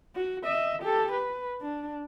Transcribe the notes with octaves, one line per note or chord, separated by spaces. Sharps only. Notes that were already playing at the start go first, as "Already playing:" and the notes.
F#4
D#5 E5
G4 A4
B4
D4